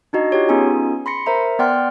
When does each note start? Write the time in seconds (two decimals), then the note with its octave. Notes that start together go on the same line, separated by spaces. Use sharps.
0.13 D4 D#4 F#4 D#5
0.32 F4 G4 C#5
0.49 B3 C#4 D#4 F4 G#4 G#5
1.06 B5 C6 A#6 C#7
1.26 A#4 C5 E5 A#5
1.59 B3 D5 F#5 G5 C6 F6